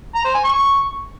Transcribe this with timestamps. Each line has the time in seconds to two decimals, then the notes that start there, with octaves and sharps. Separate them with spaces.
0.15 A#5
0.25 C5
0.34 G#5
0.44 C#6